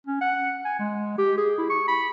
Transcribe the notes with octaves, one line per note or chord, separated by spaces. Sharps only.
C#4
F#5
G#5
G#3
G4
G#4
E4
C#6
B5